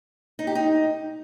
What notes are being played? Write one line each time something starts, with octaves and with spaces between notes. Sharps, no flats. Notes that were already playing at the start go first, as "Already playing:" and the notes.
D#4
G4
D#4